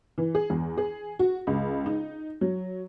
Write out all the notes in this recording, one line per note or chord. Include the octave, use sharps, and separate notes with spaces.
E3
G#4
E2
G#4
F#4
C#2
D#4
F#3